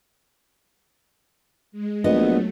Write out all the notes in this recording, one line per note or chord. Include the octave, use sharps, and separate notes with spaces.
G#3
A#1 F#3 A3 B3 D#5